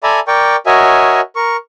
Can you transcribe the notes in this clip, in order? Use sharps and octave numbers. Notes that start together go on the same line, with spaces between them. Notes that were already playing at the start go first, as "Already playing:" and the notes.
A4 D5 E5 G#5 A#5 B5
A#4 D5 G5 C#6
F#4 A#4 C#5 D#5 E5 G#5
A#4 C#6